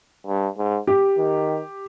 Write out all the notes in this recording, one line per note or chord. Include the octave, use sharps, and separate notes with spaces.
G2
G#2
G4
D#3